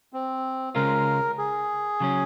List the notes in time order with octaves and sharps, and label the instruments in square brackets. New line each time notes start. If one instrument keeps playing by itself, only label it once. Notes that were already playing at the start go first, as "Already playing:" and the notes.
[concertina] C4
[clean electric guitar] C#2 C#3 G#3 C#4 F4 [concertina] A#4
[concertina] G#4
[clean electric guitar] C#3 F#3 C#4